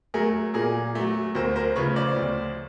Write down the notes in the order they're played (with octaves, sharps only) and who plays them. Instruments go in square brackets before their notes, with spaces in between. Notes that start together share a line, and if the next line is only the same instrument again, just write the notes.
[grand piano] F#3 A3 G#4 A#4
A#2 G#4 A#4
F#3 A3
D2 A#4 C5
A#4 C5
C#3 F3 A3 B4 C#5
C5 D5
D2